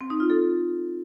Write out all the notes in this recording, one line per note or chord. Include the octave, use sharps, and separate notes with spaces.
C4
D#4
F4
A4